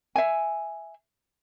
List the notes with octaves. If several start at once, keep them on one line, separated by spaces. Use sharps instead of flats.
E5 G#5